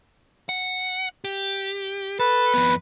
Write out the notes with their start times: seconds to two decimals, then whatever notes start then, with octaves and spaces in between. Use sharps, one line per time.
0.49 F#5
1.24 G4
2.19 A4 B4
2.54 F2 B3